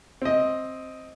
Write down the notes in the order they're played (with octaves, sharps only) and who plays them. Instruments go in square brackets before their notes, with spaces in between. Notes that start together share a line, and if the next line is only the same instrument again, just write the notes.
[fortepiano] C4 D#5